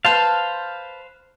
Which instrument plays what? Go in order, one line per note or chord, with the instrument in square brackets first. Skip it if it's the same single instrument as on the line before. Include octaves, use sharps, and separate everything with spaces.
[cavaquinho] B4 A5 [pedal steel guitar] C5 F5